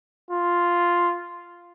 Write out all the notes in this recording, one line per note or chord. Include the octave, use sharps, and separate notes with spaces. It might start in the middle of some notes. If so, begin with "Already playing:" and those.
F4